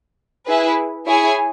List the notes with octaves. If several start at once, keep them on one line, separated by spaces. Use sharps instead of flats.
E4 G#4 B4
E4 G#4 C#5 G#5